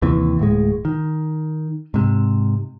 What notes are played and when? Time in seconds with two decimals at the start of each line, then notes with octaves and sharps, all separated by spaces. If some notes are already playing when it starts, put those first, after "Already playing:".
0.02 D#2 C3 E3
0.39 D1 A2 G#3
0.85 D#3
1.94 G#2 C3